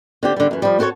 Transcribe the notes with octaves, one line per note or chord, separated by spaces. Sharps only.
D3 C4 G4
D3 G3
F#2 E3
F3 G3
C4 F#4 A4 A#4 C#5